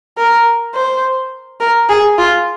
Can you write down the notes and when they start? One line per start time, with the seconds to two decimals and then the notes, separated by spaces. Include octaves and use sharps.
0.18 A#4
0.75 C5
1.60 A#4
1.89 G#4
2.18 F4